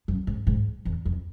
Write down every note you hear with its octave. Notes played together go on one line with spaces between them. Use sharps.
F#2
G#2
G#2
E2
F2